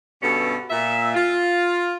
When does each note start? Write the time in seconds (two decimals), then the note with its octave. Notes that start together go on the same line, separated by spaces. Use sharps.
0.22 G2 B2 C#4 A4
0.70 A#2 E5
1.14 F4